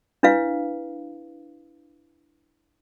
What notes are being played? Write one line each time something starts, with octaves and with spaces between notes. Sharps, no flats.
D4 E4 B4 F5